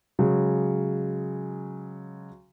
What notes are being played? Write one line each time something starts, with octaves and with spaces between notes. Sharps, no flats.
C#3 F#3 G#3